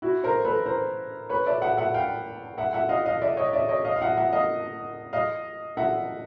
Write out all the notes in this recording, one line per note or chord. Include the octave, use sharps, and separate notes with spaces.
E4 F#4
A#4 C5
A4 B4
A#4 C5
B4 C#5
D5 E5
E5 F#5
E5 F#5
F5 G5
E5 F#5
E5 F#5
D#5 F5
D#5 F5
D5 E5
C#5 D#5
D5 E5
C#5 D#5
D#5 F5
F5
E5 F#5
E5 F#5
D#5 F5
D#5 F5
E5 F#5